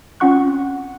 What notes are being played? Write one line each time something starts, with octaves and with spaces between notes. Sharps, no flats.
C4 C#4 F4 F#5 C#6 F#6